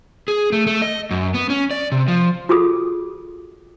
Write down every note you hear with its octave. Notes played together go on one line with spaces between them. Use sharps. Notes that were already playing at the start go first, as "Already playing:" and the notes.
G#4
A3
A3
D#5
F#2
B3
C#4
D5
C3
F3
F4 F#4 G#4 A4 D#6